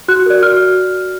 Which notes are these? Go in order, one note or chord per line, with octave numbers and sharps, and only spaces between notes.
F#4 F#6
A#4 D5
F#4 F6